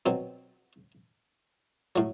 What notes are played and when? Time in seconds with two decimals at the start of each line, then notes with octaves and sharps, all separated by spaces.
0.06 B2 F#3 C4
1.96 A2 F#3